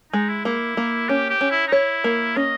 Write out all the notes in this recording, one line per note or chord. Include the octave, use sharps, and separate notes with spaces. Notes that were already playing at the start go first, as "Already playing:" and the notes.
G#3 D#4
E4
A#3 E4
A#3
C#4 G4
G4
C#4
E4
D#4
E4 C#5
A#3
C#4 D#5